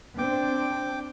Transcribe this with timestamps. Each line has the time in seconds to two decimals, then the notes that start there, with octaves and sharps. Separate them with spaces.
0.18 C4 D4 G5 D6